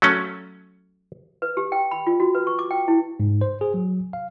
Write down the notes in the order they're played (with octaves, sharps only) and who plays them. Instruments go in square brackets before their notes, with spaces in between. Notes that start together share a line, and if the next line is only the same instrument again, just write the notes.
[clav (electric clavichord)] F#3 A3 C#4
[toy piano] B4
G4
G5
B5
F4
F#4
B4
C#6
D6
G5
E4
[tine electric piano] G#2
C5
G#4
F#3
F5